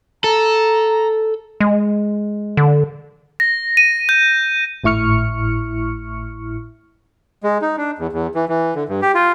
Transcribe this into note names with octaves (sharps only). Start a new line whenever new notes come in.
A4 A#5
G#3
D3
A#6
D#7
G6
G#1 A2 E4 C#6 F6 C#7
G#3
D#4
D4
E2
E2
E3
E3
D3
G2
G4
F4